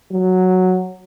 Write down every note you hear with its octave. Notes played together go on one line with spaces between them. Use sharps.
F#3